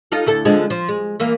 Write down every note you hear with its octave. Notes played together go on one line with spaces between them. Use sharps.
D#4 F4 A4
D2 E4 A4
D3 F3 G#3
F3
G#3
E3 A#3